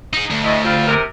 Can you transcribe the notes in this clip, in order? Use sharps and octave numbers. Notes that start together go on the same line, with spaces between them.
D#4 G#4
D2
A2 E4 D#5
G3 C4 F4
C3 A#4